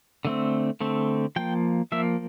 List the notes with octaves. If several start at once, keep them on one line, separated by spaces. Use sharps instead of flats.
D3 A3 C4
D3 A3 C4
F3 A#3 G5
F3 A#3 E5